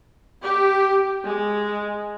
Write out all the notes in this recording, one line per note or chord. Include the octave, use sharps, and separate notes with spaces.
G4
G#3